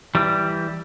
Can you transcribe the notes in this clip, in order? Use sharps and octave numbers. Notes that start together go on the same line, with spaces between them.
E3 G3